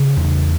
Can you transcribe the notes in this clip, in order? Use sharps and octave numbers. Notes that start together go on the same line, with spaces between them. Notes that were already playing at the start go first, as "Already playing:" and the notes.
Already playing: C#3 B3
E2